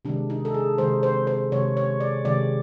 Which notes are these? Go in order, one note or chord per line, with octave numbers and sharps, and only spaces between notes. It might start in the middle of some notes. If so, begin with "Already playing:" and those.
C3 D#3 G#3 D4
D#4
A4
G#4
C3 D#3 G#3 C5
C5
C5
C3 D#3 G#3 C#5
C#5
D5
C3 D#3 G#3 D5